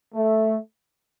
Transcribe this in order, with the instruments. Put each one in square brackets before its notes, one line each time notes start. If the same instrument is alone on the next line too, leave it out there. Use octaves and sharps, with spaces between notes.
[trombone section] A3